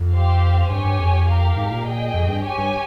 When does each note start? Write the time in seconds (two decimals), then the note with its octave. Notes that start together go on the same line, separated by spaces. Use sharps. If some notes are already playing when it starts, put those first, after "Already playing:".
Already playing: F2
0.13 C4 G4 C5 F5
0.70 G2 G4 C#5 G#5
0.84 G2
0.99 F2
1.28 G4 A#4 F5
1.56 G#2
1.71 A#2
1.85 G#4 D#5 G5
2.14 F2
2.28 G2
2.43 G4 C#5 G#5
2.58 G2